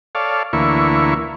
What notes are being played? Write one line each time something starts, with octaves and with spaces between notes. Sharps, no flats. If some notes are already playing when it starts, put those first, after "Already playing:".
A4 C#5 D5 F5
D2 E3 A#3 E4 C#6